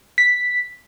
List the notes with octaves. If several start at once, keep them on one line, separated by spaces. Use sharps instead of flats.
B6